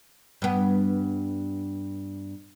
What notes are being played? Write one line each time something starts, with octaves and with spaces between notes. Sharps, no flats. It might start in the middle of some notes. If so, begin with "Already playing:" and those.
G2 B3